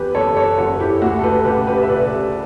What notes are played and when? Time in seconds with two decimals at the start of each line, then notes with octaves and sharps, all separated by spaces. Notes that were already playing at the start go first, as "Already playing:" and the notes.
Already playing: E2 G4 B4
0.14 F#1 A4 C#5
0.37 A4 C#5
0.58 F#1 F#4 A4
0.80 E4 G4
1.02 D2 F#4
1.19 A4
1.24 G4 B4
1.45 C#3 G4 B4
1.67 G4 B4
1.83 E5
1.89 C#3 B4 D5